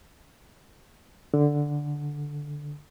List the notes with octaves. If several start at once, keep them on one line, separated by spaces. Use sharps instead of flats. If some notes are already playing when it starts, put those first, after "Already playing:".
D3